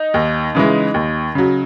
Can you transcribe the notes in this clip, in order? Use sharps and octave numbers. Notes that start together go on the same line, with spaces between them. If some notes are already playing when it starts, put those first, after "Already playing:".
Already playing: D#4
D#2
C#3 E3 G#3
D#2
C#3 F#3